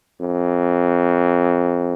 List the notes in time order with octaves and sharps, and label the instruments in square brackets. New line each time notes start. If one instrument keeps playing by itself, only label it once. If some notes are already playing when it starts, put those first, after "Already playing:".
[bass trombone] F2